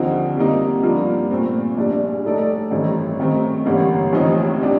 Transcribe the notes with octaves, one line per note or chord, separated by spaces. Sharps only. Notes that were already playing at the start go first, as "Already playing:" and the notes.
Already playing: D#2 D3 F3 C4 D#4
C3 G3 A#3 D#4
G2 F3 A#3 D4 F4
A#2 A3 C4
A#1 A#2 G3 D4
A2 A3 D#4 A4 D5
A1 G2 D#3 A3 C4
C3 D#3 A3 C4
A1 G2 D3 G3 A#3
A1 A2 F3 C4 D#4
C3 G3 D4 G4